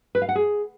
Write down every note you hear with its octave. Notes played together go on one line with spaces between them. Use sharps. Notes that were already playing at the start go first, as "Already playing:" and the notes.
B4
F5
F#5
G#4